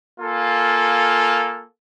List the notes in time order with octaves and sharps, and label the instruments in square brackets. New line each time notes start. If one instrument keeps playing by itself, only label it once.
[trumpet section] A#3 F4 A4 G#5